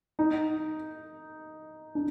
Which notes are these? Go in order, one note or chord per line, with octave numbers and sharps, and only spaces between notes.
D#4
D4